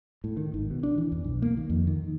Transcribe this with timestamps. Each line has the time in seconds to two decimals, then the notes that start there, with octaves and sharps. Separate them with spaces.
0.24 A2
0.37 D#3
0.54 G#1
0.70 B2
0.83 D4
0.98 E3
1.12 E2
1.24 B1
1.42 A#3
1.57 D#3
1.70 F2
1.87 D#3